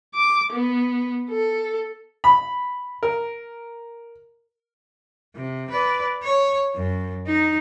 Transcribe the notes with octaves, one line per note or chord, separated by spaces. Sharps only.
D6
B3
A4
B5
A#4
C3
B4 D5
C#5
F#2
D#4